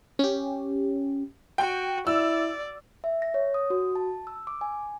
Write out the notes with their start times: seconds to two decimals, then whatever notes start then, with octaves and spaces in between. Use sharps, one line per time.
0.19 C#4 G4
1.58 F#4 G5
2.07 E4 D5 E6
3.04 E5
3.22 A#6
3.34 C#5
3.54 D#6
3.70 F#4
3.95 A5
4.27 E6
4.47 D6
4.61 G#5